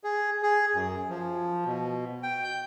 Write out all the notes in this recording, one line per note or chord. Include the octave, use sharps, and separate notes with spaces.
G#4
G#4
F#2
F3
B2
G5
G6